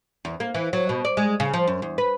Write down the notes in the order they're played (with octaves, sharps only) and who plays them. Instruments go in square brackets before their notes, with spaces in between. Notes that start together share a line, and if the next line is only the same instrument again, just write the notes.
[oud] E2
A#3
E3
F#3
B2
D5
G#3
C#3
F3
F#2
E2
B4